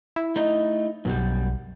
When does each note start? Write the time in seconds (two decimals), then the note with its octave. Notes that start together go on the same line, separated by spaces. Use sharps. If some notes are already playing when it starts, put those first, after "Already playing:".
0.16 E4
0.36 A3 D#4 D#5
1.05 B1 F#2 B2 G3